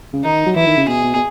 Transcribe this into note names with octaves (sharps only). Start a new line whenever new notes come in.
C#3
D#3 D#4
F#3
E3 E4
D#3
C#3
B2 G#4
B2
B2